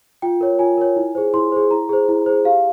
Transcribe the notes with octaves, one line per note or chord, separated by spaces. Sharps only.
F4 G5
A#4 C#5
F4 G#5
A#4 C#5
E4
G#4 C5
E4 C6
G#4 C5
E4 A#5
G#4 C5
E4
G#4 C5
G4 F5